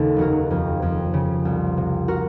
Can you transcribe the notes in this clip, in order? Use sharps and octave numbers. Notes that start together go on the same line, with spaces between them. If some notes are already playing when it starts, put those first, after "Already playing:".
Already playing: D#2 C#3 D#4 A4
F1 F#4 A#4
F2
F2
C#3
C2
C3
F#4 A#4